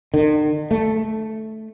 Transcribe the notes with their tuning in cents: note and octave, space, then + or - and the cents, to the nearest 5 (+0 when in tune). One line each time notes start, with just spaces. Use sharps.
D#3 -45
A3 -5